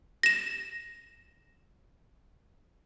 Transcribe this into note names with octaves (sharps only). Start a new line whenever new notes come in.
A#6 E7